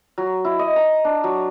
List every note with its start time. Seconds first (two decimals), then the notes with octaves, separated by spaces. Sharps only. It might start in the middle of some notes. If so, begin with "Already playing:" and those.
0.18 F#3
0.45 E4
0.59 D#5
0.76 A#5
1.05 D4
1.24 F#3